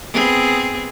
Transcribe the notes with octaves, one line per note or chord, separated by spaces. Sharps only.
B3 C4 G#4